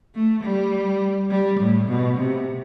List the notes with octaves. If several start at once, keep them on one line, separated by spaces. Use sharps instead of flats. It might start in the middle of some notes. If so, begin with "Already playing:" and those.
A3
G3
G3
A2
B2
C3